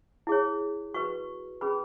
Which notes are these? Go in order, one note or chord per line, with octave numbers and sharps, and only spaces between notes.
E4 G#4 C#5
F#4 B4 C#6
C#4 G#4 B4 B5